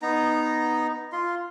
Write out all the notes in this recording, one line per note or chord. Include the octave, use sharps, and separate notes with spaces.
B3 D#4 A#5
F4 C6